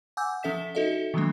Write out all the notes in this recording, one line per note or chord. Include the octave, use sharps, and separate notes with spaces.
F#5 G#5 D6 E6 G6
F3 C#4 A4 E5 B6 E7
D#4 F#4 A4 D#5 E5
D#3 F3 F#3 G#3 A#3 D4